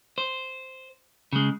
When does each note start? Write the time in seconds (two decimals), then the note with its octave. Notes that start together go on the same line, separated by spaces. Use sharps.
0.18 C5
1.33 C#3 G#3